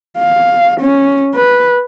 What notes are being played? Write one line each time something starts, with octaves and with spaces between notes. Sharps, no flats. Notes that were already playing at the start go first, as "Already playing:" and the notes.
F5
C#4
B4